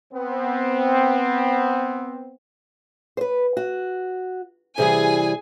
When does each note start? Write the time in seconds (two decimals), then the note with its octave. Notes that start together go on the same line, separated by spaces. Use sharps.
0.13 B3 C4
3.17 B4 C5
3.57 F#4
4.78 C3 E3 G3 G#4 G#5